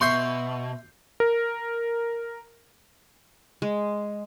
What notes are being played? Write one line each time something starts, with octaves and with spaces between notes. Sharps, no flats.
B2 E5 C6 C#6 G6 C7
A#4
G#3